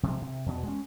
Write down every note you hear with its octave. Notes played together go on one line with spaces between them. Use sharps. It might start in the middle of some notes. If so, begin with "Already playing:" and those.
C3 F3 G#3
C3
E2 B2
G#3 C#4